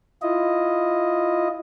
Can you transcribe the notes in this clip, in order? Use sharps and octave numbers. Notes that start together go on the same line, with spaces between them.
E4 F4 D#5